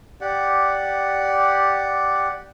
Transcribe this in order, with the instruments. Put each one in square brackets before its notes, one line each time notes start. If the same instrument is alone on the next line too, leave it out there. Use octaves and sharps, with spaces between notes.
[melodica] G4 D5 F#5